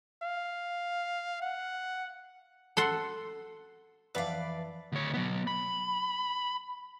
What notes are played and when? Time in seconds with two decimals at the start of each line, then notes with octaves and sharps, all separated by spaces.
0.22 F5
1.42 F#5
2.77 A4 F#5 C6
4.15 F2 E3 B4 D5 F5 F#5 B5 D6
4.92 D2 C#5
5.14 F#3 B3
5.47 B5